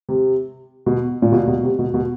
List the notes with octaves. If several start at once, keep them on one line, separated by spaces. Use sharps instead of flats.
C3
B2
A#2
B2
B2
C3
B2
B2